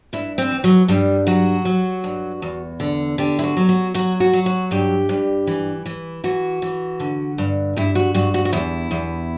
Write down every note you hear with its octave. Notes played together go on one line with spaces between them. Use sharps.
G2 E4
C4
E3
F#3
G2 G3
F#3 F#4
F#3
G2
E2
D3
D3 G4
E4
F#4
F#3
F#4
F#3 F#4
F#4
F#3
F#4
G2 G4
G2
E3
E3
E3 F#4
E3
D3
G2
G2 E4
F#4
G2 F#4
F#4
F#4
E2 E4
E2